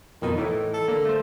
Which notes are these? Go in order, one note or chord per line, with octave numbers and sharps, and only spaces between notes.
F2 B2 D#3 D#4
A2 E3 D#4 E4
A4
D3 A#3
A3 C5